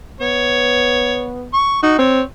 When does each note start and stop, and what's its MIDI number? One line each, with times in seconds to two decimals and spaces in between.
0.21 1.49 59
0.21 1.28 73
1.53 1.78 85
1.83 1.95 63
1.83 1.94 66
1.98 2.21 60
1.98 2.22 73